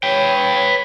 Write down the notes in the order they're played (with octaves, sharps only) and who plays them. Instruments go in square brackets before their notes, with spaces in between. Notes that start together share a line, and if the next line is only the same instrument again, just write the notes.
[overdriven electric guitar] B4 G5 [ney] C#5